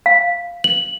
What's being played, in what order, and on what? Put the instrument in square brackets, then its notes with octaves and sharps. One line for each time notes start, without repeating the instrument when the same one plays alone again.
[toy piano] F5
[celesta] F#7